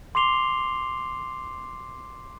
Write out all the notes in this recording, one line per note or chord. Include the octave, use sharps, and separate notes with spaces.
C6 D6 C7 F7 G7